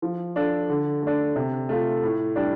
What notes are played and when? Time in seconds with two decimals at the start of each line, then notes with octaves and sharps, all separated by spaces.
0.02 F3
0.36 D4 F4 A4
0.69 D3
1.02 A3 D4
1.36 C3
1.69 A3 F4
2.03 A2
2.36 G3 D4